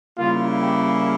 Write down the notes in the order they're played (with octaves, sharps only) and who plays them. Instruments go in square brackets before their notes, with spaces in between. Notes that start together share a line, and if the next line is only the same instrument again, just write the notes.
[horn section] C#3 G3 A#3 E4 F4
G4